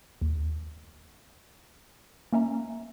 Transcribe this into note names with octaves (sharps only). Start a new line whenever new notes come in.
D#2
A#3 C#4 E5 A#5